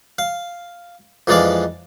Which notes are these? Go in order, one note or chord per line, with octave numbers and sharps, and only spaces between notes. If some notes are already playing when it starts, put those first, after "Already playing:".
F5
F2 E3 G#3 D4 D5 F5